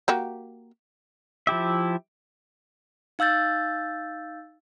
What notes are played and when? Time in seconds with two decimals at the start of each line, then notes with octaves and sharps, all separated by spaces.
0.08 A#3 F#4 G4
1.47 F3 E4 G4 E5
3.19 D#4 F5 E6 G6 A6